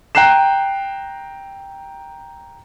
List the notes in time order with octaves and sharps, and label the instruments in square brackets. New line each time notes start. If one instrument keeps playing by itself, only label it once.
[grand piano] G5 A#5 F#6 C7 E7